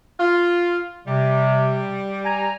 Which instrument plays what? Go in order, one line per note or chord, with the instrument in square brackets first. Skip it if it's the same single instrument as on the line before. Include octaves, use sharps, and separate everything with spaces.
[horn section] F4
[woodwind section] C3 [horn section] G3
[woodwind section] G#5 A#5